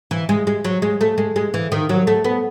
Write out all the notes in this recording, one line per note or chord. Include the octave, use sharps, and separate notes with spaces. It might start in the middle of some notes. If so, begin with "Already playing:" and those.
E3
G#3
G#3
F#3
G#3
A3
G#3
G#3
E3
D#3
F#3
A3
B3